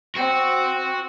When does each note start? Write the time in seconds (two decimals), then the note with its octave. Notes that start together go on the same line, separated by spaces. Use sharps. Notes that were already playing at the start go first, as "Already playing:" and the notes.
0.16 C4 F#4